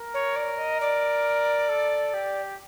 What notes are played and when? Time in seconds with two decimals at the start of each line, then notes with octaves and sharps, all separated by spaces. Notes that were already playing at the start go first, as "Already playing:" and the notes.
Already playing: A#4
0.14 C#5
0.36 D5
0.58 D#5
0.80 D5
1.69 A4
2.13 G4